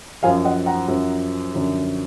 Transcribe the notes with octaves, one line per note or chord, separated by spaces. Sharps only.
F#2 F3 F5 G#5
D#5 F#5
F#5 A#5
F#2 F3
F#2 D3 F3